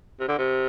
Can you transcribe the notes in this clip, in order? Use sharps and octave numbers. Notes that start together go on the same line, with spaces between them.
C3
D3
C3